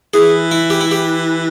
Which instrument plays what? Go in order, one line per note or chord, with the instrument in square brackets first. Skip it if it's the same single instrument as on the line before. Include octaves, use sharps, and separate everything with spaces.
[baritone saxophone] E3 [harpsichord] G#4
[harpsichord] E4
G4
E4
G4